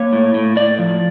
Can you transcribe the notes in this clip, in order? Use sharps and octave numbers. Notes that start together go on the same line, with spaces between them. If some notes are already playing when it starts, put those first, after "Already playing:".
Already playing: A#3 C#5
A2
A2
A2 D5
F3